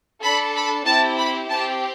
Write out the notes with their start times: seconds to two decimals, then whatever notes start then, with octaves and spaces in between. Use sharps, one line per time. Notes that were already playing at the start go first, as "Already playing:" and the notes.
0.22 D4 A4 B5
0.55 B5
0.86 C4 E4 G4 A5
1.17 B5
1.49 C4 G4 A5